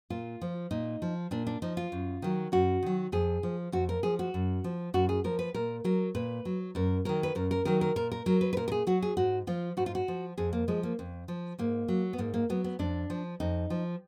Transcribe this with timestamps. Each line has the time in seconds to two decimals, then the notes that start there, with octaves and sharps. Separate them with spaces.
0.10 A#2 F4
0.41 F3
0.71 A#2 D#4
1.02 F3
1.31 A#2 D4
1.47 D4
1.62 F3 D#4
1.77 F4
1.92 F#2
2.22 D#3 F#3
2.52 F#2 F#4
2.82 D#3 F#3
3.12 F2 G#4
3.43 F3
3.72 F2 F#4
3.89 A#4
4.03 F3 G#4
4.19 F#4
4.34 F#2
4.64 F3
4.94 F#2 F#4
5.09 G#4
5.24 F3 A#4
5.39 B4
5.54 A#2 A#4
5.84 F#3 A#4
6.15 A#2 B4
6.45 F#3
6.75 F#2 A#4
7.05 D#3 F#3 A#4
7.23 B4
7.35 F#2 A#4
7.51 A#4
7.65 D#3 F#3 A#4
7.81 A#4
7.96 A#2 A#4
8.12 A#4
8.26 F#3 A#4
8.41 B4
8.53 B4
8.57 A#2 A#4
8.68 A#4
8.72 G#4
8.87 F#3 F#4
9.02 G#4
9.17 G#2 F#4
9.47 F3 F4
9.77 G#2 F#4
9.86 F4
9.95 F#4
10.08 F3
10.38 F2 G#4
10.53 A#3
10.68 F3 G#3
10.83 A#3
10.99 F2
11.28 F3
11.59 G#2 A#3
11.88 F#3
12.13 B3
12.18 G#2 A#3
12.34 A#3
12.49 F#3 B3
12.64 B3
12.79 F2 D4
13.10 F3
13.40 F2 D#4
13.70 F3